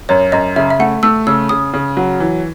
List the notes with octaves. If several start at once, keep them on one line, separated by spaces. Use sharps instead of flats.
F#2 C#5
F#2 D#5
C#3 E5
E5
A3 F#5
A3 E6
C#3 E6
C#3 D#6
C#3
F#3
E3